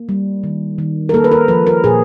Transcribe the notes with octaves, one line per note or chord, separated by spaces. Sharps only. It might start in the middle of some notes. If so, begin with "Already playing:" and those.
Already playing: A#3
G3
D#3
D#3
A#4
A#3 A4
B4
A#4
F3 B4
A#4
A#2 G#4